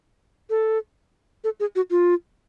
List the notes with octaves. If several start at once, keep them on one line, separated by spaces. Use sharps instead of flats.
A4
A4
G#4
F#4
F4